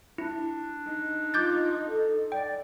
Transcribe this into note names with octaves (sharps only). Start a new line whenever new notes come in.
D4 E4
D#4
F4 D6 G6 A6
A4
D5 G5